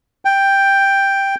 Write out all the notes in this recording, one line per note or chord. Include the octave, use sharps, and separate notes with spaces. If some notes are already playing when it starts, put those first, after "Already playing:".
G5